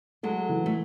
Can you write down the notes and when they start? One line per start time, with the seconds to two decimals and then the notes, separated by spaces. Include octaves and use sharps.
0.23 F#3 G#3 A3
0.49 E3
0.66 A3